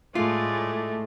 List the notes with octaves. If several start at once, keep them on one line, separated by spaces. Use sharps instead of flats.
A2 G#3 A3 F4 D5